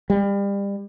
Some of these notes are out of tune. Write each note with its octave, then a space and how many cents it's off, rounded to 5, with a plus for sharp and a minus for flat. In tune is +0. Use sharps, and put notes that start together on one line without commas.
G3 +30